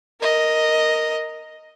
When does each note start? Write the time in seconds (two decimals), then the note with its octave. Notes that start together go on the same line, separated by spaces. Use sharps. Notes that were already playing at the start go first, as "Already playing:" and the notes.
0.20 A#4 D#5